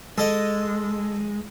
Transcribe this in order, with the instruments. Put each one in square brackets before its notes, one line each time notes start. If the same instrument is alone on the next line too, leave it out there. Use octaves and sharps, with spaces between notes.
[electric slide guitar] G#3 [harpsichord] A4 D#5